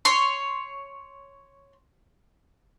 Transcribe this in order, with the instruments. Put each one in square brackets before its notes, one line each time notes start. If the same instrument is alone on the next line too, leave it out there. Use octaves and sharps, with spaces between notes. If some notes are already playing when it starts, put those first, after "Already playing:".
[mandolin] C#5 C6